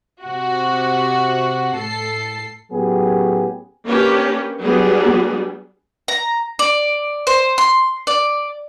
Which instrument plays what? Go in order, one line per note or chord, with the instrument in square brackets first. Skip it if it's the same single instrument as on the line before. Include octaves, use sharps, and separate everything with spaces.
[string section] C3 F#4
A2 A4 C7
[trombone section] A2 F#3 B3 C#4 G4 G#4
[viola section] A#3 C#4 D4 G4 B4 C#5
F#3 G3 B3 D4 G#4
[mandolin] A#5
D5
C5
C6
D5